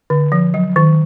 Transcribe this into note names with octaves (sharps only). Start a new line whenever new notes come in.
D3
F3
F#3
D#3